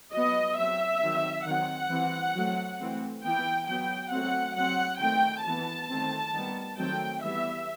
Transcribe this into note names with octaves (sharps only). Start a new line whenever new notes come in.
F#3 B3 D#5
F#3 C4 E5
D#3 F#3 C4
D#3 F#3 C4 F#5
E3 G3 C4
F#3 A3 C4
E3 A3 C4
E3 B3 G5
F#3 B3 G5
F#3 A3 C4 F#5
F#3 C4 F#5
D#3 A3 C4 G5
E3 B3 A5
D#3 A3 C4
D#3 G3 B3
D#3 F#3 A3 C4 G5
E3 G3 B3 E5